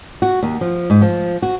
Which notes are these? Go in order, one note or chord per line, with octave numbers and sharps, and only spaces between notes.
F#4
D#2
F3
G#2
F3
F#4